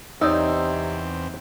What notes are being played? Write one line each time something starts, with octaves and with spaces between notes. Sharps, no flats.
E2 C3 C4 D#4 C#5 D5 E6